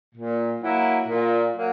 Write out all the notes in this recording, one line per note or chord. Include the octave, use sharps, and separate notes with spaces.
A#2
F#3 A#3 E4
A#2
F#3 A#3